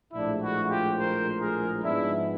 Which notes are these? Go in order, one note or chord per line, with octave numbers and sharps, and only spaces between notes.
A#1 A2 F3 G#3 D4 E4
E4 F#4
F4 G4
A#4 C5
G#4 A#4
G#2 F3 G#3 B3 D4 E4